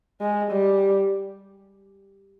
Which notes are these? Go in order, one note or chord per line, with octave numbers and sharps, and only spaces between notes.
G#3
G3